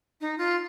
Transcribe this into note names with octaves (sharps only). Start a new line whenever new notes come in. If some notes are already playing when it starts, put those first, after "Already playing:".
D#4
F4